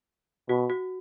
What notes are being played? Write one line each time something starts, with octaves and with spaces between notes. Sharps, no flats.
B2 F#4
F#4